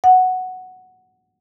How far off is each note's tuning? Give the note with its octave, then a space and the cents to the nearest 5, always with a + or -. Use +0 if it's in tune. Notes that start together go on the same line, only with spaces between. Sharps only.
F#5 +0